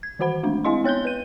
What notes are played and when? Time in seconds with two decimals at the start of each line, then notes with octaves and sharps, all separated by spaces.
0.03 G#6
0.19 D#3 E3 F#4 C5 F#5 B5
0.43 G#3 A3 D4
0.65 G#3 C4 E4 D#5 F5 C6
0.84 B3 C#5 F#6 G6 G7
1.05 B4 D#7